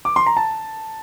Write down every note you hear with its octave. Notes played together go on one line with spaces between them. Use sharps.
D6
C6
A#5
A5